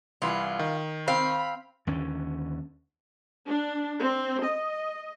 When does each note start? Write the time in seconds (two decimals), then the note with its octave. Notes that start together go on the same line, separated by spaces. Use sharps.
0.22 C2 E3 F4 B5
0.59 D#3
1.08 C4 F5 B5
1.87 D#2 D3 C#4
3.45 D4
3.99 C4
4.44 D#5